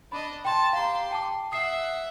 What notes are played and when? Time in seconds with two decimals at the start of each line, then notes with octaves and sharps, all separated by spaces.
0.12 D4 D#5 B5
0.45 G5 A5 C6
0.73 G4 F5 A#5 C6
1.11 G5 A5 D6
1.52 E5 F#5 D#6 C7